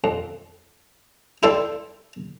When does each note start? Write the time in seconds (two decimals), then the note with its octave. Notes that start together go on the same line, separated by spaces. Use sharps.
0.04 F2
1.43 D#4 E4 A4 C5 D5 G5